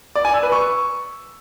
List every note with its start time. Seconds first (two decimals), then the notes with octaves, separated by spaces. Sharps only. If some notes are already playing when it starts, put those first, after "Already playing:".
0.15 D5
0.25 G#5
0.34 E6
0.43 B4
0.52 C#6